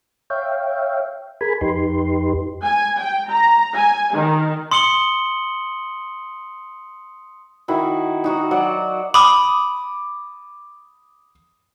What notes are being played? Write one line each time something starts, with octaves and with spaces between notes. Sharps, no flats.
C#5 E5 F5 G5
G#4 A#4 G#5 B5
F2 D#4 G4 B4 C6
G#5
G5
A#5
G#5
D#3
C6 D#6 C#7 F#7 G7
D#3 E4 F#4
D#4 F#4 F#5
F#3 D5 F#5
B5 D6 D#6